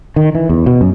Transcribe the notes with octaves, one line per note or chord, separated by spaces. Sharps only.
D#3
E3
E2
B2
F#2